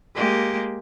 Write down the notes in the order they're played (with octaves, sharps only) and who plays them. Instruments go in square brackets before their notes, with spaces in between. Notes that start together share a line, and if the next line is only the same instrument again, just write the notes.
[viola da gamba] G#3 A#3 G4